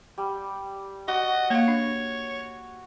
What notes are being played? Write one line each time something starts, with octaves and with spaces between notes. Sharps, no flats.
G3
F#4 D#5
A#3 C#5 F5
D4